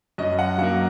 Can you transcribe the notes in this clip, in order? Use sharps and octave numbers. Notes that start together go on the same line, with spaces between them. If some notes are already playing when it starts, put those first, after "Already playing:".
F#2 D#5
F#5
F#3 A#3 F#5